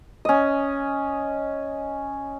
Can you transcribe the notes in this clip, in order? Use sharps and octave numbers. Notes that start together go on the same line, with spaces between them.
C#4 D#5